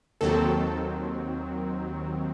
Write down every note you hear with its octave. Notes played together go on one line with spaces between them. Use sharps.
D#2 D#3 F#3 C4 A4